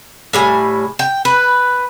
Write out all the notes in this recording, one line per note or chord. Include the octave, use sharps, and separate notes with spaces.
A2 G3 G#5
G5
B4